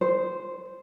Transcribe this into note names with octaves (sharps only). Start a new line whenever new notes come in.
C5